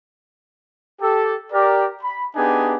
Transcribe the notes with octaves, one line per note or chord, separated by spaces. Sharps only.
G4 A4
G4 A#4 D5
B5
B3 D4 D#4 G4 G#4 G#5